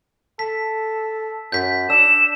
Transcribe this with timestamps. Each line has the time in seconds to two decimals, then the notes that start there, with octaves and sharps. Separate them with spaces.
0.39 A4 B6
1.52 F#2 G6 B6
1.90 D4 E6 E7